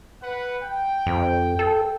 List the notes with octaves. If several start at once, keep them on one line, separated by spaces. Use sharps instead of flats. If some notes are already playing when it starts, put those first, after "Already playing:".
B4 F#5
G5
F2
A4